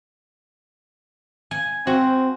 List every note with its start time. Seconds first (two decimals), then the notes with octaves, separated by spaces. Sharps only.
1.51 G#5
1.87 C4 F#4